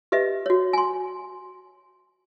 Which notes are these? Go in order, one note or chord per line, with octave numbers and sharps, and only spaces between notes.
G4 B4 D#5 E5
F#4 C#5
G#5 C6